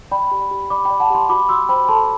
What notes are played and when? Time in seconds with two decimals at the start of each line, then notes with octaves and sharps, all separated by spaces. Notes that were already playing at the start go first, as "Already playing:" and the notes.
0.11 D5 G5 B5
0.31 G4
0.51 G4
0.70 D5 B5 D6
0.85 G5 B5
0.90 D5
1.00 F#5 A5
1.10 G4 A5 C6
1.29 F#4 B5 D6
1.49 F#4 C6 E6
1.69 C5 G5 B5
1.89 A4 A5 C6